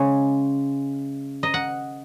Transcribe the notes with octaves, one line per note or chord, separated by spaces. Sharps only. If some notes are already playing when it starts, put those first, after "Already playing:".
Already playing: C#3 G#3 C#5
D#5
F#5